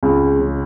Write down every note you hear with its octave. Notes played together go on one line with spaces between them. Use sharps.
C#2
C#3